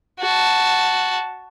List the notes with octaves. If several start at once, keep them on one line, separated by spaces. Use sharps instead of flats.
F#4 A5